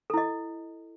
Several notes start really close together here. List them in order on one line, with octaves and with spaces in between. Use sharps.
A4 E4 D#5